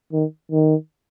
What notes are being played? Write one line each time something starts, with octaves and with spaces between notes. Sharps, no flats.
D#3
D#3